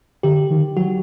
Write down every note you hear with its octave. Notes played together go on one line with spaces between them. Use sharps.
D3 G4
D#3
F#3 F#4